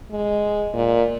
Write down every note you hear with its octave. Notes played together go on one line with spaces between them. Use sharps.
G#3
A#2